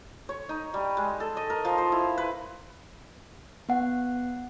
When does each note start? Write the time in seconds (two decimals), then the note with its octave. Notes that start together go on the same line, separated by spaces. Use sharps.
0.29 C#5
0.49 D#4
0.74 G3
0.97 G#3
1.20 A4
1.37 D#5
1.50 A#4
1.65 F3
1.78 C5
1.92 E4
2.18 B4
3.69 B3 F#5